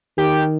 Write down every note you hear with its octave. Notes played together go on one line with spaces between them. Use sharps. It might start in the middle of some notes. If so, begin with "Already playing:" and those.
D#3 G4